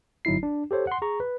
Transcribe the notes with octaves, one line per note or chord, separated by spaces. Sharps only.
G1 F#3 D#4 E4 C7
D4
G4 A4 C5 C#5
F#5 C6
G#4 A#5 C#6
B4